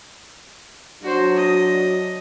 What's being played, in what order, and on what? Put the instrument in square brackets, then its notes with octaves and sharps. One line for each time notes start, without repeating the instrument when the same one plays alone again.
[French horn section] F#3 D4 [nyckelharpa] F#4 C5
[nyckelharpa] D#5